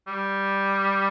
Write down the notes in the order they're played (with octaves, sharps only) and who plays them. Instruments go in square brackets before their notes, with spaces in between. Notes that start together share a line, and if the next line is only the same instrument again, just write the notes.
[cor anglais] G3